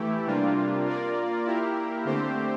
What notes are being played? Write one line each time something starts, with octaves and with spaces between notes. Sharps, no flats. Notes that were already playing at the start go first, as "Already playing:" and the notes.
Already playing: E3 A3 E4 G4
C3 G3 A#3 D4 F4
A#3 F4 A#4 D5
A#3 E4 G4 A#4
D3 A3 C4 G4 C5